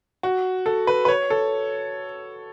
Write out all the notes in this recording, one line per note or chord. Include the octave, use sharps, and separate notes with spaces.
F#4
A4
B4
B4
C#5
A4